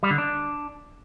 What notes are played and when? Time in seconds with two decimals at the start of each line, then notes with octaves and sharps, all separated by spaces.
0.03 G3
0.10 D3
0.18 D4